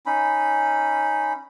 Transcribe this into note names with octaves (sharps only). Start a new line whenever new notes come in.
C#4 D#4 B5